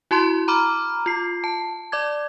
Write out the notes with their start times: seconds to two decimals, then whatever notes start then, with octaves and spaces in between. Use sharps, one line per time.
0.11 E4 F#4 A5 C6
0.48 A#5 B5 D6 F6
1.06 F4 C7
1.44 A5
1.92 D5 D6 G#6